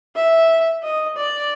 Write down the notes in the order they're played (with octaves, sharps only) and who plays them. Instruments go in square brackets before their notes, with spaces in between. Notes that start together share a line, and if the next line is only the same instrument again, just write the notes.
[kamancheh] E5
D#5
D5